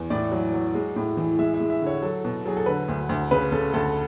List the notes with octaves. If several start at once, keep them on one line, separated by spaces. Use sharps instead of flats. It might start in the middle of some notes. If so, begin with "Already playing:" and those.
Already playing: E2
A2 D5
F#3
F#3
G#3
A2
E3
G#3 E5
E5
G#3
E5
D3 C#5
F#3 A4
B2
F#3 G#4
A4
D3 B4
D2
D2
C#3 B4
C#3 A4
D2 A4